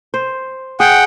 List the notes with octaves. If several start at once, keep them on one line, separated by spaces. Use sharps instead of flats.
C5
G#4 F#5 G5